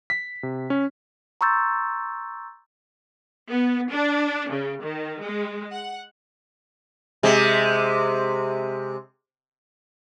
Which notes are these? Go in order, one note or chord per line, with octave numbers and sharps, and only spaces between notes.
B6
C3
C#4
A#5 C6 C#6 E6 G6 A6
B3
D4
C#3
D#3
G#3
F#5
C3 G#3